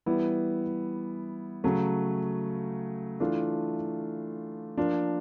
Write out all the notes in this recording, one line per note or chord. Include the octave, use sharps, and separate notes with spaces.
E3 G3 B3 E4
C#3 F#3 A3
E3 A3 D4 F4
F3 A#3 D4 F4